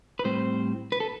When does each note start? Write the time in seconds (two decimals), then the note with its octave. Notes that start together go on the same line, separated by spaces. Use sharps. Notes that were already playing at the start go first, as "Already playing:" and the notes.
0.19 B4
0.25 A2 G3 C4 C5
0.92 B4
1.00 A4